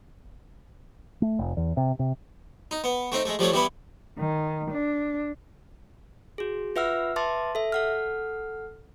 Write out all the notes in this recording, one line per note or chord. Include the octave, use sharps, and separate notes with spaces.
A3
F1
E2
C3
C3
D#4
B3
A3 C4 D#4
G#3 A3
F3 G3 A3 C#5
E3 G3 B3 E4
D#3
D4
F#4 G#4
F4 B4 E5 F#5 E6 F6
B4 E5 A5 C6 D6 A6
A4 E5
A4 F#5 F6